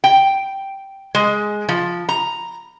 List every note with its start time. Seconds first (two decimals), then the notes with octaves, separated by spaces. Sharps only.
0.04 G5
1.15 G#3
1.69 F3
2.09 A#5